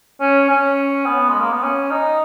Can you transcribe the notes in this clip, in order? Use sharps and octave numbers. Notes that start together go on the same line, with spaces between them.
C#4
C#4
B3
G#3
A#3
B3
C#4
D#4